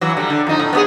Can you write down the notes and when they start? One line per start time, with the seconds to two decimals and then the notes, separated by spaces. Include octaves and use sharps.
0.01 E3 F#3
0.17 D3 G3
0.30 D3
0.47 F2 D#4
0.59 A2
0.73 B3 C#4 G#4